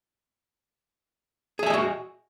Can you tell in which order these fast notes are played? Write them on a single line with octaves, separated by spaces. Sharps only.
G#4 E5 G#5 D#5 F#4